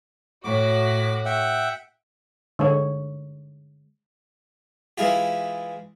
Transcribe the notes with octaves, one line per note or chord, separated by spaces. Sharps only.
A2 F#4 D6
E5 F#5 G5
D3 G#3 C#5
E3 G#3 E4 F4 G4